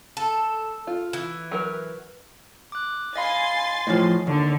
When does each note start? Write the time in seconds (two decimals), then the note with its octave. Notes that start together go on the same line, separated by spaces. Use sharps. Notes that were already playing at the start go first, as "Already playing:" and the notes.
0.17 A4
0.87 F4
1.13 E3
1.51 F#3 A#4 B4
2.72 D6 F#6
3.16 D#5 F5 G#5 B5 C6 A6
3.87 A2 F3 C#5 D#5
4.27 D#2 D3